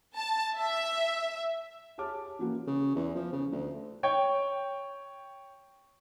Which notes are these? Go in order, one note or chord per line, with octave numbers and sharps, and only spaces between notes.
A5
E5
G4 G#4 C#5 A5 D6 F6
E3 F3 A#3 C#4 F4 F#4
C#3
E2
F3
C#3
D2
C#5 G5